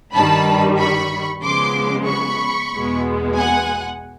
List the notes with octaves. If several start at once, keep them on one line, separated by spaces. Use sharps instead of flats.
G2 D#3 G3 A5 B5
B5 C#6
C#3 F3 G#3 B3 C6 D6
B5 C#6
E2 B2 G#3 B3
F#5 G#5